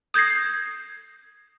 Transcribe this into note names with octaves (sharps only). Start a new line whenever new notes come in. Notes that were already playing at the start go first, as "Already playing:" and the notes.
D#6 G6 G#6 A#6 C7